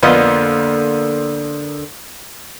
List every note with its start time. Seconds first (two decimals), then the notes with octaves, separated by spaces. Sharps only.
0.03 F2 D3 A#3 B3 F4 D#5